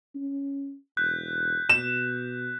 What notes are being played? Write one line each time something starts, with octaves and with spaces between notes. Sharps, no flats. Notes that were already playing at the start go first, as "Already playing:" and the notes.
C#4
E1 F#6 G6 B6
B2 E7